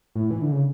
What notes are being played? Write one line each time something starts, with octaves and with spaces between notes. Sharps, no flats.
A2
E3
D3
C#3